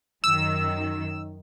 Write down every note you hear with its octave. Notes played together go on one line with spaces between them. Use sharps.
F#2 D#3 E6